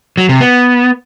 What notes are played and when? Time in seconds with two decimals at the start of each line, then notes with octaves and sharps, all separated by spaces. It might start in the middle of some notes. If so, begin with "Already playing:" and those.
0.18 F#3
0.29 C3
0.41 B3